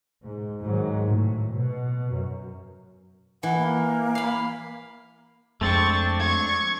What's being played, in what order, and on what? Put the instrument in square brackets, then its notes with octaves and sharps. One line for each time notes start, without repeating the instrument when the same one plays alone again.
[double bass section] G#2
G#2 D#3 F#3
A2
B2
F#2
[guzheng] E3 [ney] F#5
[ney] A#3
[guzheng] F5 B5
[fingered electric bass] F2 G#3 [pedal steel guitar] A3 C4 D4 [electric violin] C#6 A6
[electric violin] C#6 G#6